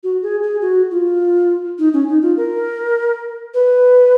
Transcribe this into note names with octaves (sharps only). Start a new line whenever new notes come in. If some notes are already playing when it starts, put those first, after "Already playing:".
F#4
G#4
G#4
F#4
F4
D#4
C#4
D#4
F4
A#4
B4